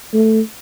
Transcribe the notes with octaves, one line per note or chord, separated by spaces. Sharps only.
A3